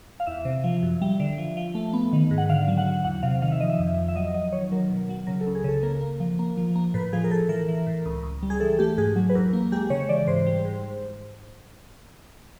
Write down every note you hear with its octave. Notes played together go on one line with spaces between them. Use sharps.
F5
E2 E5
C3
F3
F#2
G3
D3
F3
F3
A3
B3
D#3
G#2
F#5
D3 F5
F#3
F#5
F#3
E2 F#5
C3 F5
D#3 F5
E5
F3 D#5
E5
F2
F3
E5
F#3 D#5
F#3 D#5
D#3 C#5
F#3 A#4
B2
F#3
C#3 A#4
A4
C#2
G#4
C#3 A4
A#3 A#4
A#3
F3
A#3
F3
A#3
A2 B4
F3 G#4
A#4
A2 A4
E3 A#4
E3
A2
C#2
C#2
G3
G#4
E3 A4
A3 G4
G#2 G#4
F#3
B4
E2 A#4
A#3
G#3 G4
C#3 C#5
E3 D5
G#2 C5
G3
G#2